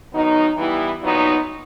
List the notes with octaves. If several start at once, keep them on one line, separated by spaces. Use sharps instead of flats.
D#3 F#3 B3 D#4
E3 G3 B3 E4
A#2 F#3 B3 D#4